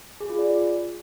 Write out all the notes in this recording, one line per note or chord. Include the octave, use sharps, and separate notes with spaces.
G#4
F4
D5